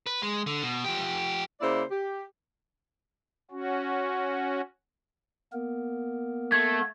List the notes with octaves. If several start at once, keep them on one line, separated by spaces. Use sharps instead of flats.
B4
G#3
D3
B2
F3 G4
C#3 A#3 E4 C5 D5
G4
C#4 F#4
A#3 B3 A#4
A3 G#6